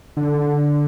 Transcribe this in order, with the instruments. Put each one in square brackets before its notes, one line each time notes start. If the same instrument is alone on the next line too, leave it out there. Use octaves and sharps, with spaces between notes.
[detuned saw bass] D3